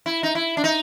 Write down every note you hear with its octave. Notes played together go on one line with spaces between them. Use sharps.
E4
D#4
E4
D4
D#4